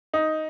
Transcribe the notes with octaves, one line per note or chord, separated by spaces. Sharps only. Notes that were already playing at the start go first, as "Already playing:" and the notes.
D#4